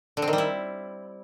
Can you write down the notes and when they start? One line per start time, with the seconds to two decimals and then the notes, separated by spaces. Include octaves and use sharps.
0.17 D3
0.22 C4
0.28 D#3
0.33 G3
0.38 E4